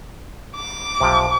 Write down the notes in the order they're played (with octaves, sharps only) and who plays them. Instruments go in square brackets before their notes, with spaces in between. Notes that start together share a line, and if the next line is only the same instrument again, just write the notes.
[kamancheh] D6
[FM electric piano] B1 [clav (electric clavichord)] C3 F3